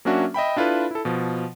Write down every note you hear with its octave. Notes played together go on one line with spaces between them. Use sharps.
F#3 A#3 C#4 D4 F#4 E5
D#5 E5 G5 B5
D4 E4 F4 A4 B4
E4 A4
B2 F3